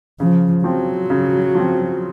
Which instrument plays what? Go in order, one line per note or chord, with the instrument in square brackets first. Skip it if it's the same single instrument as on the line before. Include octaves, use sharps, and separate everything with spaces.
[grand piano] C#3 [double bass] F3
[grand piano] F3 C4 [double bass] F#3
[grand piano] C#3
F3 C4